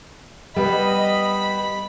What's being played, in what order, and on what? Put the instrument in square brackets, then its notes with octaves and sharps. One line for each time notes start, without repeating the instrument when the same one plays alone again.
[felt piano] G3 B3 [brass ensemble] D#5 [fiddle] B5